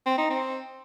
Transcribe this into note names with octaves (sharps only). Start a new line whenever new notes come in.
C4
D#4
C4